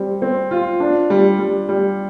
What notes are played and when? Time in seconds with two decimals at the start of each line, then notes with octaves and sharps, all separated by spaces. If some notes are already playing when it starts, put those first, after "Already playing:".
Already playing: G3 C4
0.22 C4
0.51 F4
0.80 D4
1.10 G3
1.39 G3
1.69 G3